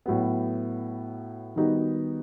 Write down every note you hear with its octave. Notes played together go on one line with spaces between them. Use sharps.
A2 F#3 B3
D#3 G3 B3 D#4 F#4